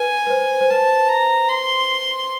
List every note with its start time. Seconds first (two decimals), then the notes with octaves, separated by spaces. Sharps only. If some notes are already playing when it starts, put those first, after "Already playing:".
Already playing: B4 G#5
0.27 B4
0.30 C5
0.61 C5
0.70 B4 A5
1.08 A#5
1.49 C6